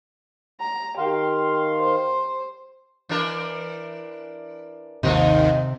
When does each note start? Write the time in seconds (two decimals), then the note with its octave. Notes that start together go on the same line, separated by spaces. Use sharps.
0.60 A#5
0.98 D#3 G4 F5 C6
1.81 C5
3.09 E3 D4 A#4
5.03 G#1 D#2 C3 D#3 F3 D#4